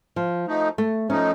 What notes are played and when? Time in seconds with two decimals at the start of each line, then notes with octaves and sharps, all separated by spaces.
0.16 F3
0.47 F3 A3 D#4
0.78 A3
1.10 F3 A3 C#4 D#4